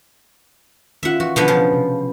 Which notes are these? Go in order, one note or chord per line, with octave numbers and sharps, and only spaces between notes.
D#3 C#4 F4 E5 F#5
E3 F#4
B2 D3 F3 B3
C#3 F3
C3